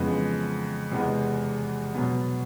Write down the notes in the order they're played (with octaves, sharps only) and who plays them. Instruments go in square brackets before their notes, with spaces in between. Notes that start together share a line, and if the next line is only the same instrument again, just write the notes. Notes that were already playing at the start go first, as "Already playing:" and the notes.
Already playing: [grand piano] F2 C#3 E3 G#3 B3
E2 C3 E3 G#3 B3
B2 F#3 B3